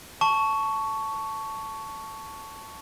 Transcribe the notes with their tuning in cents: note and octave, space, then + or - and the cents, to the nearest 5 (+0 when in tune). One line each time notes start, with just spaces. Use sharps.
A5 +0 C#6 +10